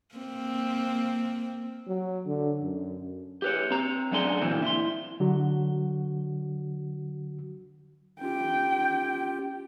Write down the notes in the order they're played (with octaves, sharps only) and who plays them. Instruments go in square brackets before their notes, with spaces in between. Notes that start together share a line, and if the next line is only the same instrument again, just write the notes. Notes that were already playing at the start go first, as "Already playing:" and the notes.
[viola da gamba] A#3 C4
[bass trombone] F#3
D3
F#2
[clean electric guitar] G4 B4 C#5
C4 A#5
F#2 A3 D4 G#4 C6
A#2 D3 E3 C4
E4 C6
[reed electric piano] D3 F#3 F#4
[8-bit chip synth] C#4 F4 G4 [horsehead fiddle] G5